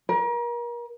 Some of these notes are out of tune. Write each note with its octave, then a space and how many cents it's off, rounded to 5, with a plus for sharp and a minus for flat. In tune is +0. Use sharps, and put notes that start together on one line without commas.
A#4 +35